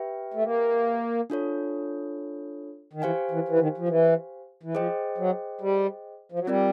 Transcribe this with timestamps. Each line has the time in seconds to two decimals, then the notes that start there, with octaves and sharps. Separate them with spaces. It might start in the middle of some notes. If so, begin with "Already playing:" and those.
Already playing: G4 B4 E5 G5
0.34 A3
0.44 A#3
1.30 D4 F4 A4 C#5
2.93 D#3
3.02 E3 G4 C5 F5 G#5
3.31 E3
3.48 E3
3.59 D#3
3.78 F3
3.88 E3
4.63 E3
4.75 F3 G#4 C5 D#5 G5
5.18 F#3
5.61 G3
6.32 F3
6.39 F#3
6.47 G3 C4 F4 A#4 D5